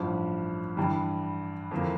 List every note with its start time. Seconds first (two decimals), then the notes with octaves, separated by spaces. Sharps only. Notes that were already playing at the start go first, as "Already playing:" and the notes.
Already playing: A1 G2 F3
0.77 G2 E3 G3
1.71 F2 E3 A#3